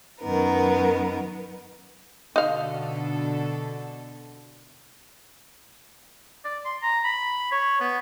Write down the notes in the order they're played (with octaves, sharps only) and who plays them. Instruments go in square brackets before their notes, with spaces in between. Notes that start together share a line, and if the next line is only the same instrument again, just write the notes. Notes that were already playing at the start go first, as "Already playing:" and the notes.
[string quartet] F#2 D#3 B3 A#4
[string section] B2 D3 A4 [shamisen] D#4 F5
[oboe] D5
C6
A#5
B5
C#5
B3